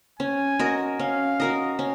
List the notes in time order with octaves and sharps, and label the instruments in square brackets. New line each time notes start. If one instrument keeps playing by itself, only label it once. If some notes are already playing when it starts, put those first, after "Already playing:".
[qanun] C#4 [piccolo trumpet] G#5
[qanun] F#4 A#4 D#5
[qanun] C#4 [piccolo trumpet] F5
[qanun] F#4 A#4 D#5
C#4